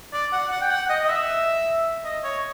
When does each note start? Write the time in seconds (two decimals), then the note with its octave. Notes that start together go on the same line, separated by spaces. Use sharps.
0.13 D5
0.33 F#5
0.51 F#5
0.62 G5
0.70 F#5
0.90 D#5
1.05 D#5
1.08 E5
2.04 D#5
2.24 C#5